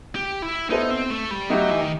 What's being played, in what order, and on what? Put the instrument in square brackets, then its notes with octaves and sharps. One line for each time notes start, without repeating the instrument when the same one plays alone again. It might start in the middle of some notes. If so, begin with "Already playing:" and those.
[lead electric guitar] G4
E4
[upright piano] B3 E4 A4 C5 [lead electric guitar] D#4
[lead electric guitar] C4
A3
G3
[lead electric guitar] F#3 [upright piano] A3 D#4 G4
[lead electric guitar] E3
D#3